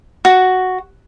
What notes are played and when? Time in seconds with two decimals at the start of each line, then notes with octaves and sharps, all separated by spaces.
0.25 F#4